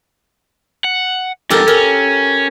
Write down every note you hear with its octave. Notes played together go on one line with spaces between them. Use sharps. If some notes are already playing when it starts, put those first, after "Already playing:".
F#5
F2 G#2 G4 A4 A#4
C#4 A#4